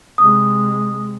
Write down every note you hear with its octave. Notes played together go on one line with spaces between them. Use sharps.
C3 G#3 D#6